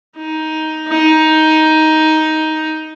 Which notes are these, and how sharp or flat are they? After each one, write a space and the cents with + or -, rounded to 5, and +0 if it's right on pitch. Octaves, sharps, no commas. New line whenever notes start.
D#4 +10
D#4 +10